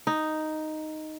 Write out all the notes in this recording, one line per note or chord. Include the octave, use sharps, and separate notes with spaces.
D#4